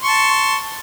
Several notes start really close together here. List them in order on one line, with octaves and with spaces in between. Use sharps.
C6 C#6 A5